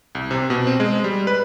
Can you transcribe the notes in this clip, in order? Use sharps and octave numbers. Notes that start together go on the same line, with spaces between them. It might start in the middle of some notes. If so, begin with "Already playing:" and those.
C2
C3
B2
C4
G#3
G3
B4